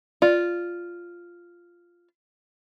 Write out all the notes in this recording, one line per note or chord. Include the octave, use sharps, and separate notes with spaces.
F4 D5